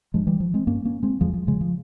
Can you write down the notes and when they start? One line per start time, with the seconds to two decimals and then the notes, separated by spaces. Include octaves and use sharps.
0.14 G2 F3 G#3
0.27 E3 G3
0.40 F3
0.54 G#3 C4
0.67 G2 A#3 C#4
0.85 A#3 C#4
1.03 G#3 C4
1.21 E2 F3 G#3
1.34 F3
1.47 C#3 F3 G#3
1.61 F3